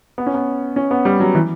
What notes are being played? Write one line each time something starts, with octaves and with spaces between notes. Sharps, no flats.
B3
C#4
B3
C#4
B3
G3
F#3
E3